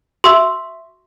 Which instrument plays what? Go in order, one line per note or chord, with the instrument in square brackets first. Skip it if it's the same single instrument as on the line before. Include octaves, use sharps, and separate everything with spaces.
[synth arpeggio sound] F#4 E5 [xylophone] C6 E6